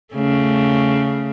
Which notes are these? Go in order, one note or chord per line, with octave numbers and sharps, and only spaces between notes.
C#3 A3